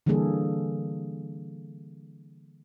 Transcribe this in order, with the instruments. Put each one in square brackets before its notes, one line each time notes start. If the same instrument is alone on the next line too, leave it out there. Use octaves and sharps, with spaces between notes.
[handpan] D3 E3 G3 A#3 G#4 A4